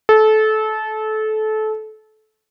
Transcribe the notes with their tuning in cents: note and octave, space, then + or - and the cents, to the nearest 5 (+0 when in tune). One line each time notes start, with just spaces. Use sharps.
A4 -25